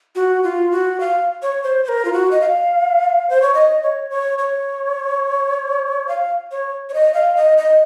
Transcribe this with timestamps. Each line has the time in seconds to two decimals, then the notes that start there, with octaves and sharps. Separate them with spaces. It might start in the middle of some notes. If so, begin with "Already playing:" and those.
0.15 F#4
0.43 F4
0.71 F#4
1.00 F5
1.42 C#5
1.64 C5
1.85 C5
1.89 A#4
2.05 F4
2.13 F#4
2.31 D#5
2.41 F5
3.30 C5
3.42 C#5
3.54 D#5
3.83 C#5
4.10 C#5
4.38 C#5
6.08 F5
6.51 C#5
6.89 C#5
6.94 D#5
7.14 F5
7.37 D#5
7.58 D#5